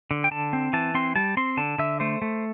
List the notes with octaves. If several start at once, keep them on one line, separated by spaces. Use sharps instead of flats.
D3
G5
D3 A5
C4
E3 A5
C4 C6
G3 A5
C4 C6
D3 A5
D3 E5
A3 C5
A3